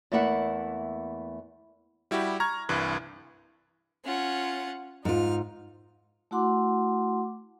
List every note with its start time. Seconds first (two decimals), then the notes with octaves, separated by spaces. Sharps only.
0.12 E2 A3 A#3 E4 E5 F#5
2.11 G3 E4 F#4 G4
2.40 A#5 C#6 F6 G#6
2.69 C2 G2 E3 F#6
4.05 C#4 F4 F#5
5.05 G#2 D#4 F4 F6
6.31 A3 E4 F#4 F#5 C6 D6